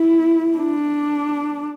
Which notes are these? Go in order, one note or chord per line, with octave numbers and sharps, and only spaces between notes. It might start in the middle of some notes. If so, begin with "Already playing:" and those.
Already playing: E4
D4